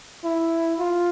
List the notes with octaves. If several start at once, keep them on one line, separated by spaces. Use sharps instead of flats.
E4
F4